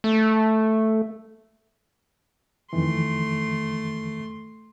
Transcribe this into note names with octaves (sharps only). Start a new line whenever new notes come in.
A3
F2 D#3 E3 A3 C6